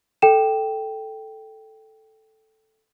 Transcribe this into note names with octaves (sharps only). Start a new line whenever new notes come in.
A4 G5 E7